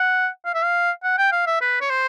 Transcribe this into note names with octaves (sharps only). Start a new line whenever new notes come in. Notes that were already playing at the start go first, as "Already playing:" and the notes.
Already playing: F#5
F5
E5
F5
F#5
G5
F5
E5
B4
C#5
C5